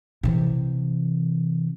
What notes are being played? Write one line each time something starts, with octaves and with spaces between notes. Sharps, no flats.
C3 E3